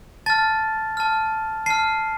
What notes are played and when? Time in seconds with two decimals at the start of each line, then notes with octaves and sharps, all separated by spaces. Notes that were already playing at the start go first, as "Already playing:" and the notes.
0.26 A5 F6 A6
0.97 A5 F6
1.66 A5 F6 C7